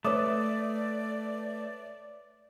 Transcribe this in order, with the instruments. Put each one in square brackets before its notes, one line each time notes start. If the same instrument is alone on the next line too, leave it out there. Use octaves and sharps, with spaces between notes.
[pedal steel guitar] A3 [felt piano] B4 C#5 D#6 [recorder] D5 [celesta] D6